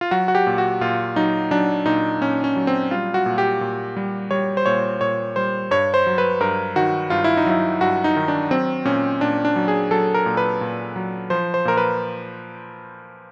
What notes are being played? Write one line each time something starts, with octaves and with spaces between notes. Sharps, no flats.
F4
F#3 F#4
F#4
G4
A#2
F#4
A#2 F4
F#3 D#4
F#3 D4
A#2 D#4
A#2 C#4
C#4
F#3
C4
G3 F4
F#4
A#2
G4
A#2
G3
G3 C#5
C5
A#2 C#5
A#2 C#5
G3 C5
G2 C#5
C5
F#3
B4
G2 A#4
D#3 F#4
G2 F4
E4
D#4
F#3 E4
G2 F#4
D#4
D#3
D4
F#3 C4
A#2 C#4
A#2 D4
D4
F#3
G#4
F#3 A4
A#4
A#2
B4
A#2
F#3
F3 C5
C5
A#2 A#4
B4